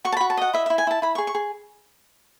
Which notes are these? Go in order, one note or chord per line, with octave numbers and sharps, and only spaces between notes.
F#4 C#6
A5
B5
F#4
A5
D#5 F#5
E4 E5
E5
E4
G#5
E4 A5
E4 B5
C#6
G#4
C#6
G#4